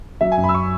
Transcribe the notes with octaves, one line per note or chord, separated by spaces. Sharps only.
F#3 E5
G#5
F#2
B5
E6
C#6